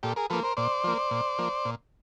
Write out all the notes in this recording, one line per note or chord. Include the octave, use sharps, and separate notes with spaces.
A#2 G4 A4
G#4 A#4
F3 A#3 A4 B4
A#4 C5
A#2 C5 D5
F3 A#3
A#2
F3 A#3
A#2